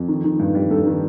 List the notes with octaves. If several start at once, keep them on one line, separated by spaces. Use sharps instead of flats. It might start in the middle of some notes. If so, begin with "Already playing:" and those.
Already playing: F2
D#3
D#3
G2
G3
G2 A4
D#3